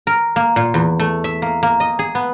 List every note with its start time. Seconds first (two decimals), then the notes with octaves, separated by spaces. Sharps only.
0.07 A#4
0.36 A#3
0.56 A#2
0.74 E2
0.99 A3
1.24 E5
1.42 A#3
1.63 A#3
1.80 D#5
1.99 G#4
2.15 B3